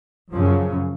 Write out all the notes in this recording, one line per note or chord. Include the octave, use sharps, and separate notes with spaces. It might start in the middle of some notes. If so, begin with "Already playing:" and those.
F#2 C#3 F3